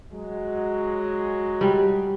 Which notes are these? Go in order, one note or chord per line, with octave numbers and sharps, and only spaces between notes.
F#3 G#3
G3